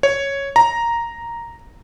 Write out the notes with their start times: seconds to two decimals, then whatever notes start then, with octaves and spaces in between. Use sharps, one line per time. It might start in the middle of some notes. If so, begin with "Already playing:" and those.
0.03 C#5
0.56 A#5